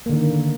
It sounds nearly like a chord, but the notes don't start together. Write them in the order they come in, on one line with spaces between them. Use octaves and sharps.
A#3 D3 D#3